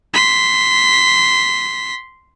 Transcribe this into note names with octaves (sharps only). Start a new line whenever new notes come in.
C6 B6